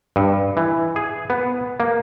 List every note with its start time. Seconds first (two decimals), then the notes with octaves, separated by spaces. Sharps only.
0.16 G2
0.57 E3
0.96 G#4
1.30 B3
1.80 A#3